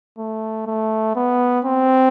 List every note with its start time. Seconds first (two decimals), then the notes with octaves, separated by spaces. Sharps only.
0.18 A3
0.67 A3
1.16 B3
1.65 C4